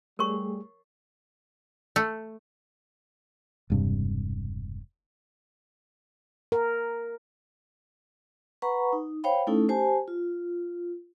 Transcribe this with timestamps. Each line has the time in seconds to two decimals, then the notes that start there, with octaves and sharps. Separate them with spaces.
0.19 G3 A3 G4 G#4 A#4 C#5 C#6
1.96 A3
3.70 E1 G2 C3
6.52 A#4
8.62 B4 F#5 A#5 B5 C#6
8.93 D#4
9.24 C5 C#5 F5 G5 B5
9.47 A3 C#4 D#4 E4 A4
9.69 G4 C5 G#5 A5
10.08 F4